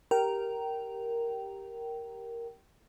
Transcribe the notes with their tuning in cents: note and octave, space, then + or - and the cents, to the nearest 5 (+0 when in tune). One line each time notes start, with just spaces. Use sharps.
G4 +0 A#4 +0 G5 -20